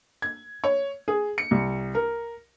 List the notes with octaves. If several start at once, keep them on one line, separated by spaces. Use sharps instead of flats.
G#6
C#5
G#4
C#7
C2
A#4